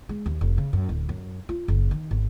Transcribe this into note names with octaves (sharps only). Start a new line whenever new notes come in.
G#3
D#2
F1
C#3
F#2
D1
F#2
F4
F#1
D#3
G#1